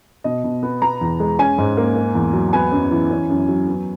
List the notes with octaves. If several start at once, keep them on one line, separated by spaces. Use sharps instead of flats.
B2 D#5
B2
B3
B3 A#5
E2
G#3
C#4 G#5
G#2
A#3
A#3
E2
F#3
B3 G#5
F#2
E3
C#4
F#2
F#3
B3